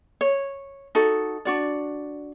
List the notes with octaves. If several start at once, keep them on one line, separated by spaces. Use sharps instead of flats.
C#5
D#4 F#4 A4
D4 F#4 D5